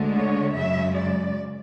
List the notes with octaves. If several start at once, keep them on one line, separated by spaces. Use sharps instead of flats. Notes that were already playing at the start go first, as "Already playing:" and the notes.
Already playing: D2 D3 G#3
C#5
F#2 C#3 G#3 E5
D5